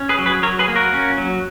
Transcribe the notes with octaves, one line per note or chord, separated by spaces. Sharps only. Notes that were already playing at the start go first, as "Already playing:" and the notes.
Already playing: C#4
G#4 B4
F#3
G#4 B4
F#3 A#4 C#5
G#4 B4
A#3
F#4 A#4
C#4
F#3